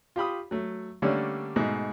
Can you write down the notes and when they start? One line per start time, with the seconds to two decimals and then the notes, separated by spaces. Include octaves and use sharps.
0.16 F4 G4 B5 D#6
0.51 F#3 A3
1.02 D3 G3 A3 A#3 C#4 D4
1.56 G#2 B2 A3